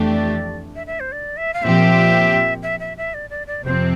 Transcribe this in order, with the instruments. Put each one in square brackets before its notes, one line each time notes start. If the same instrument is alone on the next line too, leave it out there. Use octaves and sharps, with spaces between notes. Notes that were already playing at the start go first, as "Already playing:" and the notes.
Already playing: [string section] F2 E3 A3 D4 G4
[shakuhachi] D5
E5
E5
C5
D5
E5
F5
[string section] A#2 F3 C4 G4 [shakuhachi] E5
[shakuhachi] E5
E5
E5
D5
D5
D5
[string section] F2 C3 F3 C4 [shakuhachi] C5